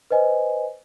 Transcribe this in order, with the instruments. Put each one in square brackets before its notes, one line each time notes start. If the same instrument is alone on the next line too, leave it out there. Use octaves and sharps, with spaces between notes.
[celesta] B4 C5 D#5 G#5